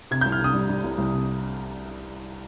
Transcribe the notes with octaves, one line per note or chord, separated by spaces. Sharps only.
C3 G#6
G6
C2
F6
C3 D#6
G3
G3
C2
C2
C3